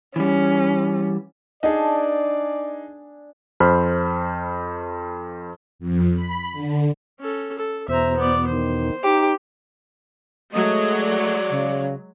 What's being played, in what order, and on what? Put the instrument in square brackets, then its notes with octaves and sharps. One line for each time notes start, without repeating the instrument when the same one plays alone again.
[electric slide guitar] E3 G3 [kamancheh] C#4
[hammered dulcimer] D4 G#5 A5 [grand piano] D#4 G#4 [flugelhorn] D5
[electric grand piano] F2 C5 B5 F6
[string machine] F2
B5
D3
[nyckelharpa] C#4 A4
A4
[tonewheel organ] E2 B2 [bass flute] C5 [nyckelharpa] E5 A#5
[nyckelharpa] B3 D5
[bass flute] D#3 [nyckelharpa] C5
[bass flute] D#4 [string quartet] G4
[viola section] F#3 G#3 [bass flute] A3 [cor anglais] D#5
[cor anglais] D5
[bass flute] C#3